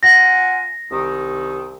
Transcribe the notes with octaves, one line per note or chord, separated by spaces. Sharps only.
F4 F#5 G#5 A#6
C2 D#3